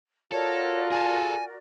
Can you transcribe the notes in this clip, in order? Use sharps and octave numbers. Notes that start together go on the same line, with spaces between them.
F4 F#4 A4 A#4 C#5 D5
G#4 A4 G#5